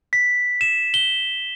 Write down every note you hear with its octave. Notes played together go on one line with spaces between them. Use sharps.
B6
E7
G7